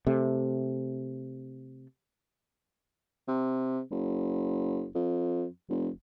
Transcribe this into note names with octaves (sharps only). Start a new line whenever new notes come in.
C3 A3
C3
F#1
F2
F1